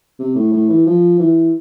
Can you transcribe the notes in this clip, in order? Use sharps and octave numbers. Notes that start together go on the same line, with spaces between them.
C3
A2
A2
E3
F3
E3